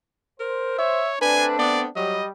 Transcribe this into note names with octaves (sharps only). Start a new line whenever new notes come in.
A#4 C5
C#5 E5
A3 C4 D4 B4 G#5
B3 D5
F#3 G3 D#5